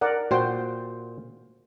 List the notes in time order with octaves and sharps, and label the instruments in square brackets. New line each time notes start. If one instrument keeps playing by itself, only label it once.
[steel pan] A#4 D5 F#5
[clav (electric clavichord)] A#2 C5 [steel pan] F#4 G5